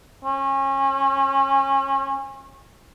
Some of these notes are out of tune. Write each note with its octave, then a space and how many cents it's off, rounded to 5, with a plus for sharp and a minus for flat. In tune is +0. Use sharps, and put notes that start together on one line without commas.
C#4 -30